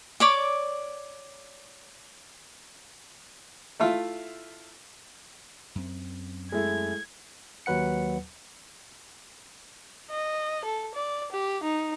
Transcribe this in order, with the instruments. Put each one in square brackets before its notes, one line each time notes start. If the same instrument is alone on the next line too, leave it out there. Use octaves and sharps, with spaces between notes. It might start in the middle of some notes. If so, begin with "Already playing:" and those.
[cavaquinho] C#5 D5 D6
[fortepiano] A3 E4 F4
[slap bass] F#2 C4
[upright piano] G#3 A3 E4 [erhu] G#6
[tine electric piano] D#2 F#3 B4 F#5 C#7
[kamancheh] D#5
A4
D5
G4
D#4